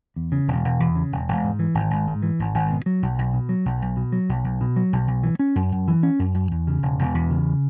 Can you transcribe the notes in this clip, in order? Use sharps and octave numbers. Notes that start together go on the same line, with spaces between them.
E2
C#3
E1
E1
E2
C#3
E1
E1
G#2
E3
G#1
G#1
G#2
E3
G#1
G#1
B2
F#3
B1
B1
B2
F#3
B1
B1
B2
F#3
B1
B1
B2
F#3
B1
B1
E3
C#4
F#2
F#2
E3
C#4
F#2
F#2
E2
C#3
E1
E1
E2
C#3